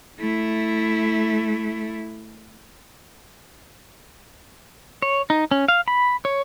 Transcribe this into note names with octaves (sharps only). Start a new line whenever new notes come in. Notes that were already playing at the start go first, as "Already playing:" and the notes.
A3 E4
C#5
D#4
C#4
F5
B5
C#5